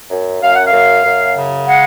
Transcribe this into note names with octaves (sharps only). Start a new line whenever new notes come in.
F#2
F#2 F5
F#5
F5
F#2
F#2
C#3
G#3 F#5